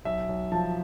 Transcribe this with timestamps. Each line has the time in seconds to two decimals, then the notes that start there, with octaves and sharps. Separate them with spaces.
0.05 B1 E5
0.29 B1
0.52 F3 A5